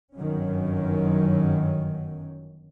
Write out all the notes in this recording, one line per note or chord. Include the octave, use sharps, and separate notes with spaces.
G1 F#2 D#3 F#3 C#4